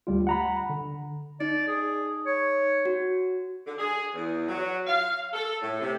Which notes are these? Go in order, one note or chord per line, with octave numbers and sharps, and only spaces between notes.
D2 G3 F4
F#5 A#5 B5
D3
D#4 D5
G#4
C#5
F#4
D3
G#4
E2
F#3
F5
A4
A2
C3